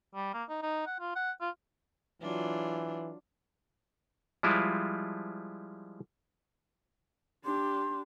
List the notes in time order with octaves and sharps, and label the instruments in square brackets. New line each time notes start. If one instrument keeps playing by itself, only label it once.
[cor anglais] G3
A#3
D#4
D#4
F#5
F4
F#5
F4
[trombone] E3 [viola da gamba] F#3 D4 F4
[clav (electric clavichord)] F3 G3 G#3 E4 F4
[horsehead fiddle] D4 G4 [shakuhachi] C6